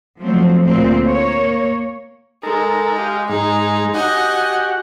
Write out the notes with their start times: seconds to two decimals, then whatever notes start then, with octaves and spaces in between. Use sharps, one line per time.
0.19 F3 F#3 A3 C4
0.65 D2 A#2 C4
1.07 A#3 C#5
2.43 G#3 D#4 A4 A#4
2.98 G4 D#5 F5
3.29 G#2 G#3 D#4
3.94 F#4 G4 D#5 F#5 G#5